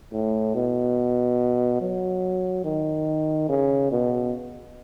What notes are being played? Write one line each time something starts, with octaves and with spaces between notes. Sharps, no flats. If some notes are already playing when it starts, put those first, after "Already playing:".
A2
B2
F#3
D#3
C#3
B2